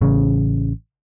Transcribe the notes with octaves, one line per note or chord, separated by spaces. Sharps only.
A1 C#3